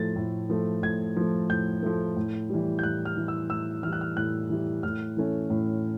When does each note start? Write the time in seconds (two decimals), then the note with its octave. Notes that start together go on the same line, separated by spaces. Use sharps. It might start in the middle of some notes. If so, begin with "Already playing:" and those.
Already playing: A2 F3 A3 A6
0.16 A2
0.50 F3 A3
0.83 A2 G#6
1.16 F3 A3
1.50 A2 G6
1.83 F3 A3
2.16 A2
2.50 E3 G3
2.79 G6
2.83 A2 F#6
3.05 F6
3.17 E3 G3
3.28 E6
3.50 A2 E6
3.83 E3 G3 F6
3.93 F#6
4.01 F6
4.17 A2 F#6
4.50 E3 G3
4.83 A2 F6
5.17 E3 A3 C#4
5.50 A2